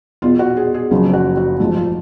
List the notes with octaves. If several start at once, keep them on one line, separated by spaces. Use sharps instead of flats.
E2 B2 F4
F#4
G#4
G#4
F#1 F#2 C#3 F3
F#4
F#4
A1 G#2 F3 F4
F4